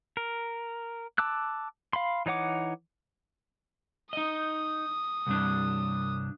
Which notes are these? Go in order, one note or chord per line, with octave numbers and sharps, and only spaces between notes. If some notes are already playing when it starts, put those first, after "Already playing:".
A#4
A5 D6 E6 F#6
F5 B5 C6
E3 D#4 C#5 F#5 D6
D#4 D#5 D#6
C2 G2 D4